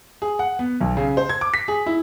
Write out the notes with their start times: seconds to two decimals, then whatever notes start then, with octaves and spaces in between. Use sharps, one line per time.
0.22 G#4
0.39 F#5
0.59 B3
0.81 B1
0.97 C#3
1.17 C5
1.29 G#6
1.41 D6
1.54 B6
1.68 G#4
1.86 E4